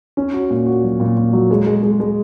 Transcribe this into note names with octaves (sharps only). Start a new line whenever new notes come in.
C#4
F#4
A#2
F#4
F#3
A#2
A#2
F#3
G#3
G#3
G#3
G#3